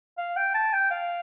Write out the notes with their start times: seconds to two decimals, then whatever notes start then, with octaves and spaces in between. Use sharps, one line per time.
0.18 F5
0.37 G5
0.54 A5
0.73 G5
0.91 F5